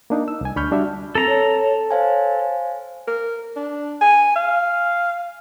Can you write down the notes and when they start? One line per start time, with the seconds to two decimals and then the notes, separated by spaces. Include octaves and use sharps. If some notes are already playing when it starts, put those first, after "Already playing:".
0.10 A#3 D4 D#4
0.28 E6
0.41 C2 G#5
0.56 D2 D4 B5 C#6 F6 G6
0.71 G3 D4 F#4 E5
1.15 C4 A4 A#5
1.28 C#5
1.91 C5 C#5 F5 G#5
3.07 A#4
3.56 D4
4.01 G#5
4.36 F5